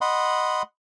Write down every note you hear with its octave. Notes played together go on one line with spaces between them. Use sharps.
D#5 F#5 B5 C6